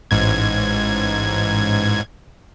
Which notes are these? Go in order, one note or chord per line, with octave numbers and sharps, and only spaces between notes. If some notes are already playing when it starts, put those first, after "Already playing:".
A1 G#2 G#6